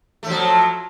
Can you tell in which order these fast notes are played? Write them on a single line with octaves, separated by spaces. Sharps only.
A3 F3 F#3